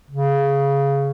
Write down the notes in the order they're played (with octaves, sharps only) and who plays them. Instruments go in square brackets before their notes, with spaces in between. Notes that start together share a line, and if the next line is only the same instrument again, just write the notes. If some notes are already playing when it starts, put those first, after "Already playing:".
[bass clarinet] C#3